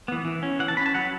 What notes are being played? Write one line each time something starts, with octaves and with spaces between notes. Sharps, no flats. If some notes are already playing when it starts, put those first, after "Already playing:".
E3 B3
E3
C#4
E3 F#5
A5
C#4 B5
A5
F#3 F#5